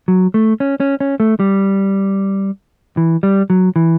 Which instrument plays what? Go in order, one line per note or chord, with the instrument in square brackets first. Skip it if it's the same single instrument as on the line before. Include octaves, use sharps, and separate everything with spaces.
[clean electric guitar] F#3
A3
C#4
C#4
C#4
A3
G3
E3
G3
F#3
E3